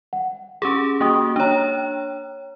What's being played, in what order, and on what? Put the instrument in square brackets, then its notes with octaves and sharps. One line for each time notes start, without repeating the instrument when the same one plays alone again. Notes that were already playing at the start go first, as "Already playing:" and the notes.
[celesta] F#5
[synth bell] C#4 G4 G#4 [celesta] D6
[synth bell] A#3 F#4 [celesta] G5 D#6
[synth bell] D4 C#5 [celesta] G5 A#5